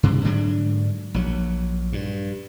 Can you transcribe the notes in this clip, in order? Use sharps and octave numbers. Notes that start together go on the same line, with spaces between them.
G2 C3
G#2 D3 F#3 D4
A#1 F#3
G2